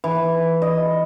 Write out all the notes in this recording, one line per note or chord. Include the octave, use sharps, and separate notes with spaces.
E3
D#5